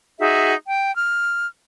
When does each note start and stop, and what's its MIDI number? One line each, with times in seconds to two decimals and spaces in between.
0.19 0.53 63
0.19 0.53 66
0.19 0.53 68
0.19 0.53 76
0.67 0.95 79
0.96 1.46 89